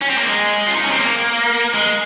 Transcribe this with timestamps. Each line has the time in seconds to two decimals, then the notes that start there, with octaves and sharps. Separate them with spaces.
0.01 C#4
0.10 C4
0.18 A#3
0.25 G#3
0.67 F4
0.75 D#4
0.83 C#4
0.91 C4
1.00 A#3
1.75 G#3